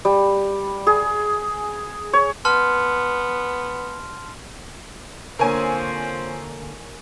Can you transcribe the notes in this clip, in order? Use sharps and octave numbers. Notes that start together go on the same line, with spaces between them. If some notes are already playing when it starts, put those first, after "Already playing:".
G3
G#4
C#5
B3 A5 C6 F6
D3 F3 A#3 C4 A#4 C#5 G#5